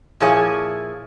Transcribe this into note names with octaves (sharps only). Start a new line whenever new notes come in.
A#2 F3 E4 G#4 C#5 G#5